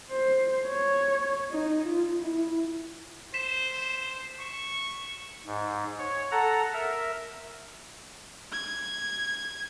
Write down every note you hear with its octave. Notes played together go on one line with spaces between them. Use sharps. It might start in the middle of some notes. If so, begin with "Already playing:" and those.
C5
C#5
D#4
F4
E4
C5 B6 E7
C#6
G#2
C#5
A4 F#5 A#5
A#4 E5
G#6